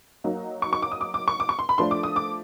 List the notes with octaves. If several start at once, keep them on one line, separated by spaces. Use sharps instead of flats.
F#3 A#3 D#4
C#6
C#6
D6
D#6
D6
D6
C#6
D6
C#6
C6
B5
F3 A3 D4 C6
D6
D#6
D6